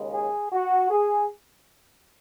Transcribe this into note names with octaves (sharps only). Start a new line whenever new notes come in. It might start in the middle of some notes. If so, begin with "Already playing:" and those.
Already playing: D#2 C#3 G#3
G#4
F#4
G#4